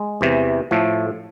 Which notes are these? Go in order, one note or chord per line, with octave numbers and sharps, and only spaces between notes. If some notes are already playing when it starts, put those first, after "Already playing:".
Already playing: G#3
E2 C3 E3
A2 F3 A3